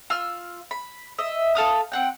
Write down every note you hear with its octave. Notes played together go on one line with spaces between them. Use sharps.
F4 E6 F6
B5
D#5 E5
A4 F5 D#6
C4 F#5 G5